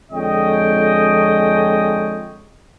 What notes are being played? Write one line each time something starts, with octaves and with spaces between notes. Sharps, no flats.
F2 D3 G#3 C#5 D#5 G5